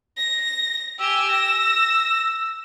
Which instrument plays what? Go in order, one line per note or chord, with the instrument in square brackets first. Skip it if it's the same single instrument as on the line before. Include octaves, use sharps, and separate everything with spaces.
[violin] A#6
[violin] G4 G#5 [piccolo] E6
[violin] A#6